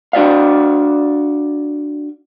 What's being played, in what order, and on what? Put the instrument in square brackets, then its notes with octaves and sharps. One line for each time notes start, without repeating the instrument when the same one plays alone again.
[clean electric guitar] D4 F#4 D5 F5